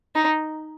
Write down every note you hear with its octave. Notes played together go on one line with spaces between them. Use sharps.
D#4